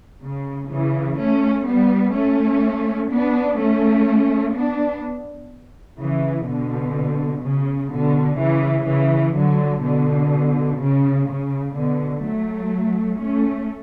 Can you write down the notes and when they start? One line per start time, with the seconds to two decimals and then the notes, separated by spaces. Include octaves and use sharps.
0.22 C#3
0.71 C#3 E3
1.18 A3 C#4
1.66 G3 B3
2.15 A3 C#4
3.11 B3 D4
3.58 A3 C#4
4.55 B3 D4
5.99 C#3 E3
6.47 B2 D3
7.43 C#3
7.91 B2 D3
8.39 C#3 E3
8.87 C#3 E3
9.36 D3 F#3
9.83 B2 D3
10.79 C#3
11.28 C#3
11.76 B2 D3
12.24 F#3 A3
13.20 A3 C#4